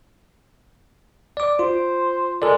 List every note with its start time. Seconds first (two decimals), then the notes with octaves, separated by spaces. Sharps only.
1.37 D5 D6
1.59 F4 C5
2.42 G#3 A4 A#4 D5